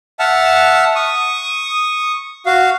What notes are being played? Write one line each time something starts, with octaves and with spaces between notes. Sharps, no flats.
E5 F#5 A5 F6
C#6 D#6
F#4 F5